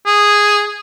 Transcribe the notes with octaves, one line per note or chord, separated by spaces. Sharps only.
G#4